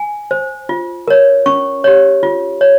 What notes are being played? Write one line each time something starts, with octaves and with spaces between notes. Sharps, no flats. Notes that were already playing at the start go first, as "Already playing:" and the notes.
Already playing: G#5
C5
F4
A#4 C#5
C#4 C#6
G4 C#5
F4
C#5